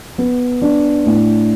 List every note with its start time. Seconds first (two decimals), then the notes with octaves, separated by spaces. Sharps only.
0.18 B3
0.62 D4
1.06 A2